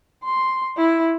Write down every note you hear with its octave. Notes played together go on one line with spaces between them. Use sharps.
C6
E4